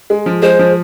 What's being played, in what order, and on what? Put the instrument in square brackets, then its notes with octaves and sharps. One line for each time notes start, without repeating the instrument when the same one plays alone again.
[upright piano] G#3
F3
[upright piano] G#3 [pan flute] C5
[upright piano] F3